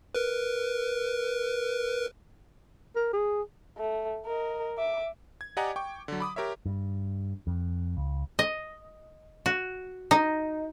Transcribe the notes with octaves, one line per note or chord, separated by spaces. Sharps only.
A#4 B4
A#4
G#4
A3
A#4 D#5
E5 D6
G#6
G4 D5 D#5 F#5 G#5 A#5
G5 C#6 D6
D3 F#3
B5 D6 D#6
G4 A#4 C#5 E5
G2
F2
C#2
D#5
F#4
D#4